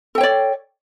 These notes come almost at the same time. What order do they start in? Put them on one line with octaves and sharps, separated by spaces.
A4 G5 C#5 D5